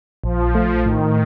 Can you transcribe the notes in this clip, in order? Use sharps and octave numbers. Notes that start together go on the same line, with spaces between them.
A#1 F3
A3
A2 D#3